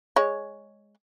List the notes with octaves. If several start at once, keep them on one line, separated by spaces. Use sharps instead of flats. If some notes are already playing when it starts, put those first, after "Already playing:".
G#3 C#5